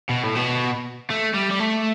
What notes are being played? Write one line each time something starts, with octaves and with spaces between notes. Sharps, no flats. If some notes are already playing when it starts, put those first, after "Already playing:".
B2
A2
B2
A3
G3
G3
A3